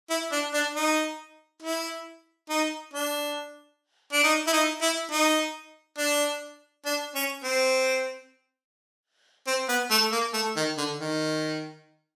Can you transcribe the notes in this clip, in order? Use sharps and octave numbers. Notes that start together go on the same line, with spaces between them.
E4
D4
D4
D#4
E4
D#4
D4
D4
D#4
E4
D#4
E4
D#4
D4
D4
C#4
C4
C4
B3
A3
A#3
A3
D#3
D3
D#3